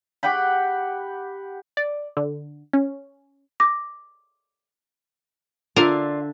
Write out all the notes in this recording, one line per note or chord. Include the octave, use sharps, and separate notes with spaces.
G4 F#5 G5 B5
D5
D3
C#4
D6 A#6
D3 F4 A#4 D5 E5 F5